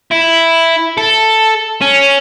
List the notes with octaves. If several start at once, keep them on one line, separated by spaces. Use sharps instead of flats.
E4
A4
C#4